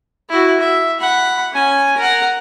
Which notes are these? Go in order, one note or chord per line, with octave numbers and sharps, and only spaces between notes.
E4 F#4
E5
F#5 B5
C#4 G#5
A#4 F#5